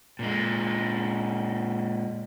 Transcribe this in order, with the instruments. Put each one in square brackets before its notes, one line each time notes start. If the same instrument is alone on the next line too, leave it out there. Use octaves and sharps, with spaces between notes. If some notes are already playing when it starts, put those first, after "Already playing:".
[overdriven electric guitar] A#2 G#3